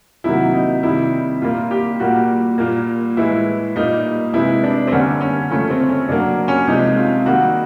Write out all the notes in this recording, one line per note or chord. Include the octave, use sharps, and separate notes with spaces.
C3 D#3 F#3 A#3 E4
D#4
C3 D#3 G3 E4
A#2 G3 A#3 F4
G4
A#2 G3 A#3 F#4
A#2 G3 A#3
A2 E3 G#3 E4
A#2 G3 A#3 D#4
C3 E3 G#3 E4
D4
C4
D3 G3 A#3 C#4
C#4
C#3 F3 A3 C#4
C4
C#4
C#3 F#3 A#3 D4
C#4
C3 F3 G#3 D#4
F4
D#3 G3 A#3 F#4